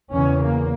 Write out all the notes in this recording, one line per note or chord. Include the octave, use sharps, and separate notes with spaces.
E2 C#3 C#4
A#3